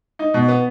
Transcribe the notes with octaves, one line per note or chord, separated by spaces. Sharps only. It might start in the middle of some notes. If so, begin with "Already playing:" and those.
D#4
B2
B3